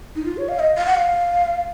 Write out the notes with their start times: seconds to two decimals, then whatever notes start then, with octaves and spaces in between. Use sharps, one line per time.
0.16 D#4
0.25 F4
0.37 C#5
0.49 F5
0.59 D#5
0.77 F5
0.87 F#5
0.95 F5